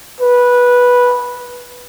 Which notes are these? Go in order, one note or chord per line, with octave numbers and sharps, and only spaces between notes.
B4